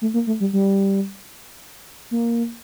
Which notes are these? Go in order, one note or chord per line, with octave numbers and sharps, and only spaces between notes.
A3
A#3
A3
G3
G3
A#3